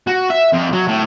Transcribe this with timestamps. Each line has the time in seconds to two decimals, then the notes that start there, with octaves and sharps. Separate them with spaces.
0.07 F#4
0.30 E5
0.53 F2
0.72 F#3
0.88 A2